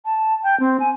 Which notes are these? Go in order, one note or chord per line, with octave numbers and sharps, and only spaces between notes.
A5
G5
C4
G#5